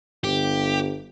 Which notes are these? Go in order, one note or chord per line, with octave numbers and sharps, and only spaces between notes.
G1 G4